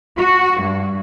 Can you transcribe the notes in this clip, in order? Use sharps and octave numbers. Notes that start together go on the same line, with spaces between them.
F#4
G2